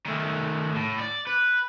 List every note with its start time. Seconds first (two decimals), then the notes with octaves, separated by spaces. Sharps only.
0.06 D#3 A3
0.75 A2
0.99 D5
1.27 B4